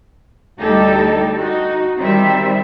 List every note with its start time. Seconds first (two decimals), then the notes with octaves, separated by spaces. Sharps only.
0.59 D2 G3 D#4 G4 A4 D5
1.37 D#4 F#4
1.97 D#3 G3 C4 E5